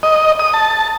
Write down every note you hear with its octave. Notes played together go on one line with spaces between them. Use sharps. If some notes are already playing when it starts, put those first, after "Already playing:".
D#5
D#6
A5